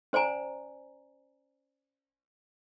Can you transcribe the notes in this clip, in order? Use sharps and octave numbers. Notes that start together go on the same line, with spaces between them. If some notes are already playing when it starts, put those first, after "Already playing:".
C#4 C5 D5 G#5 A#5